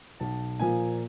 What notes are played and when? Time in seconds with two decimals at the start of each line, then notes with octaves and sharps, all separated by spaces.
0.20 B1 A5
0.60 A#2 F3 A#3 G#5